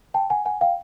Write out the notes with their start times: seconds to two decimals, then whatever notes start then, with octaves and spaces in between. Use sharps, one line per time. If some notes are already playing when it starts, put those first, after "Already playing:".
0.14 G5 A5
0.30 F#5 G#5
0.45 F#5 G#5
0.61 F5 G5